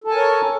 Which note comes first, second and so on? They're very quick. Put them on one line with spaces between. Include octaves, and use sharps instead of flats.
A4 A5 G#5 A#4 C#5